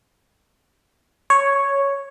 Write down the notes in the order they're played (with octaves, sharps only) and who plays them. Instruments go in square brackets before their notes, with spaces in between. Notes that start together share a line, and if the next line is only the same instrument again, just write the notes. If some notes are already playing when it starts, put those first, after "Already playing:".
[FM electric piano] C#5